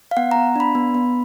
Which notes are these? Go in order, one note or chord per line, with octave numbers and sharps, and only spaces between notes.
F5
B3 F#5
B3 A#5
D4 B5
B3
B3